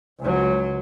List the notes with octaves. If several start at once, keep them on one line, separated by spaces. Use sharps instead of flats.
C#2 F#3